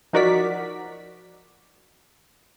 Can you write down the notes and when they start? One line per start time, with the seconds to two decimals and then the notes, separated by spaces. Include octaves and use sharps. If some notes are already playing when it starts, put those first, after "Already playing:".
0.13 F3 D#4 F#4 A#4 D5 B6